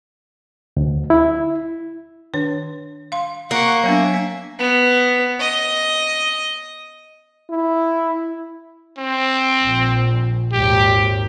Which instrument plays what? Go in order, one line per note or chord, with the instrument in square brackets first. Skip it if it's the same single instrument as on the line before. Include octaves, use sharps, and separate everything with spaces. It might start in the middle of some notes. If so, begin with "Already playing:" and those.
[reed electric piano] D2
E4
[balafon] D#3 D4 C#5
F5 C6
[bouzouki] A#3 [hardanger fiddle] F#5 C#6
[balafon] F#3 B3 D4 [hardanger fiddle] E5 G#5
[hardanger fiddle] B3
D#5
[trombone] E4
[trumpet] C4
[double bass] A#1
[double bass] G#1 D#2 [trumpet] G4